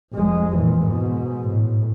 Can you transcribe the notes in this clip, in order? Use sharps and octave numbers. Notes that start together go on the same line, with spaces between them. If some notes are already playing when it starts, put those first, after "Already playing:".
F1 G#3
A#2 E3
G#2 B2
A2